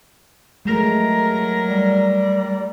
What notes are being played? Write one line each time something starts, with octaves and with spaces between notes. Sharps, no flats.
F#3 G#3 A3 A#4
G3